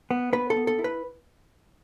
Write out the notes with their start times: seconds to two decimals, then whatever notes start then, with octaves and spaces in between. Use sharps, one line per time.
0.11 B3
0.33 B3 B4
0.50 A4
0.56 B3
0.67 A4
0.79 E4
0.84 B4